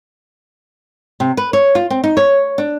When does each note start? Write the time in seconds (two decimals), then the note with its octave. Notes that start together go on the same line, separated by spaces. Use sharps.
1.20 C3
1.37 B4
1.53 C#5
1.75 F4
1.90 C4
2.04 D#4
2.17 C#5
2.58 D4